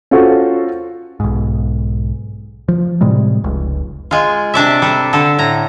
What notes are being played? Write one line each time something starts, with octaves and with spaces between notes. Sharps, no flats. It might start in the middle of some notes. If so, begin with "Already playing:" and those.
C#4 F4 F#4 A4 C5
B1 G#2
F3
A2 C3 G3 G#3
F1 C#2
G#3 F4
C3 D4 D5 E5
G3 A4
D3 A4
A2 A#5